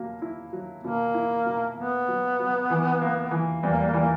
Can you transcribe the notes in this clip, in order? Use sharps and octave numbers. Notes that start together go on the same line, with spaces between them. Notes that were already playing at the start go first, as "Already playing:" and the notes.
Already playing: B2 F#3 A#3
E4
F#3
B2 A#3
E4
B2
A#3 B3
F#3
F#3
E3
A#3
E3
E2 G3
A#3
G3
A#3
E3 G3
A#3